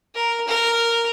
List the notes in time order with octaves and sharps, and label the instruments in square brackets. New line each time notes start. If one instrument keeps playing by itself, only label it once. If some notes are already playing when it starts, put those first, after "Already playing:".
[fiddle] A#4
A#4